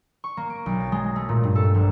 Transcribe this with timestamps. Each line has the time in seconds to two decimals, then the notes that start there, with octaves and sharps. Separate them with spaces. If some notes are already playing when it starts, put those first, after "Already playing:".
0.24 C#6
0.37 A#3
0.50 D7
0.66 B1
0.81 A6
0.92 G#3
1.16 A3
1.29 A#2
1.43 G2
1.55 A4
1.74 A#1